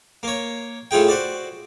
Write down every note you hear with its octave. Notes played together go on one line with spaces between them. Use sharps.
A#3 C#5
A2 A3 F4 G#4 G5
F#4 C5 D5